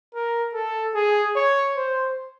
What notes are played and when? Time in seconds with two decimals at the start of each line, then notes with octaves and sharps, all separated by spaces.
0.15 A#4
0.54 A4
0.95 G#4
1.36 C#5
1.77 C5